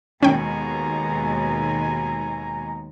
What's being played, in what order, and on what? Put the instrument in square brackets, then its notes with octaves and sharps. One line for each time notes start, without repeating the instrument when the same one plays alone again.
[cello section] D#2 B2 G#3 [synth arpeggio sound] C#4 G5 [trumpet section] G#5 A#5